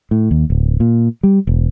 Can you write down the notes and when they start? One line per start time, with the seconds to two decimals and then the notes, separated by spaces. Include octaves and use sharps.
0.11 A2
0.31 D#2
0.50 D1
0.80 A#2
1.23 G3
1.47 E1